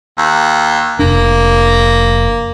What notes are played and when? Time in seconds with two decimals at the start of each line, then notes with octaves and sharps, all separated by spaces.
0.18 D#2
0.99 F1 A#3 D4